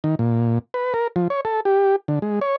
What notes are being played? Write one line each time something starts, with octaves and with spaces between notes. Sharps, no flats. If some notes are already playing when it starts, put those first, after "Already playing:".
D#3
A#2
B4
A#4
F3
C#5
A4
G4
D3
G#3
C#5